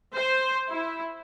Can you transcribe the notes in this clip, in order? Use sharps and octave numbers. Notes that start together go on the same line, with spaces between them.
C5
E4